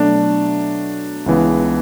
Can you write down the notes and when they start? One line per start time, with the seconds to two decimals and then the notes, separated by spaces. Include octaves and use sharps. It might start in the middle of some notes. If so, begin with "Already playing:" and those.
Already playing: B2 F#3 A3 D4
1.26 C#2 C#3 E3 B3